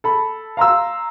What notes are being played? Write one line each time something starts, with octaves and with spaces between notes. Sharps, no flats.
A4 B5
F5 A#5 C6 E6